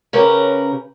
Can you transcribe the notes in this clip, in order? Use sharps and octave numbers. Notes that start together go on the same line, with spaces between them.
C#3 C#4 G4 A#4 B4